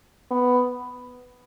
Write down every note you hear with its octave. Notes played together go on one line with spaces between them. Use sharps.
B3